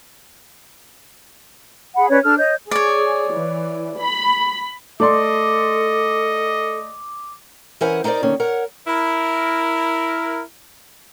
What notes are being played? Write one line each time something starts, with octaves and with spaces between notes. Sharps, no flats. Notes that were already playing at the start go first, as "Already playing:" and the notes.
G#4 F#5 B5
C#4 B4 C#5 D5
D4 A4 F6
C#5 D#5 G6
G#4 C#5 D5
E3
B5
A3 A4 D5 D#5 C6 D6
E3 C#4 A#4 C5 F#5 G#5
D#4 E4 A#4 C5 D5
D3 D#3 A#3 C#4
A#4 C#5 F#5
E4 A#4